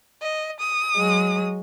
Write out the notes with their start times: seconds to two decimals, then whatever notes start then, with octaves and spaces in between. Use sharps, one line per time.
0.22 D#5
0.60 D#6
0.96 F#3 G#3